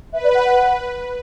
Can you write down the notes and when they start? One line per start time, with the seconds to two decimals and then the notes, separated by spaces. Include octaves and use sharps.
0.13 B4 E5
0.23 D5
0.34 F#5
0.44 F#5